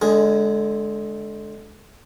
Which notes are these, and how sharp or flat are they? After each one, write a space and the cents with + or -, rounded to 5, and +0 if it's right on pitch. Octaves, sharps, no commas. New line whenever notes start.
D3 -10 G#3 +20 G#4 +0